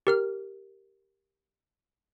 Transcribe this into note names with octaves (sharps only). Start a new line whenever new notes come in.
G4 A#4 F6